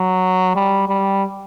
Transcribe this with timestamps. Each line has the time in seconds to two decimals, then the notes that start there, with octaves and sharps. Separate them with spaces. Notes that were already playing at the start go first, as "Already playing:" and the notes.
Already playing: F#3
0.55 G3
0.88 G3